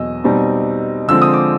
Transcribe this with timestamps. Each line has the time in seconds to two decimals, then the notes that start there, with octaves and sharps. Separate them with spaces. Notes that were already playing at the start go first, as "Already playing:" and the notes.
Already playing: E2 B2 F#3 D#5 E6
0.24 B2 G3 C4 D#4
1.08 D3 F3 G#3 C4 E6
1.22 D#6
1.34 D6